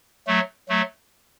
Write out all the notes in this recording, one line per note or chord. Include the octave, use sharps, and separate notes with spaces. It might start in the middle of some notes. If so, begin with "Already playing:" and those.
F#3 A3
F#3 A3